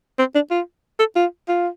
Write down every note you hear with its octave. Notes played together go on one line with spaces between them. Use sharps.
C4
D4
F4
A4
F4
F4